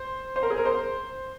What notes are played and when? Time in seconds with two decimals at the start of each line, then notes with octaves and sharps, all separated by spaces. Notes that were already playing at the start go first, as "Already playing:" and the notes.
Already playing: C5
0.36 C5
0.43 A#4
0.50 G#4
0.58 A#4
0.65 C5